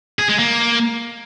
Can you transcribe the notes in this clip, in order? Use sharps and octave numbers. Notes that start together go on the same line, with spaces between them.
G#4
G#3
A#3